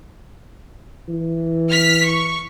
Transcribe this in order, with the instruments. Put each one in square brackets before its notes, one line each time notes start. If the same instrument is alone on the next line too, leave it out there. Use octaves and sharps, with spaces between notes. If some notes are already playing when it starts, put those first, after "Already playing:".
[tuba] E3
[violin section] F6 B6
C#6